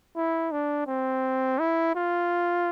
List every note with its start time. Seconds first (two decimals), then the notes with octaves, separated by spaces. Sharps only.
0.16 E4
0.52 D4
0.88 C4
1.59 E4
1.95 F4